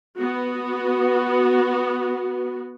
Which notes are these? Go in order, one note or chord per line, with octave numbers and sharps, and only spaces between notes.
B3 F#4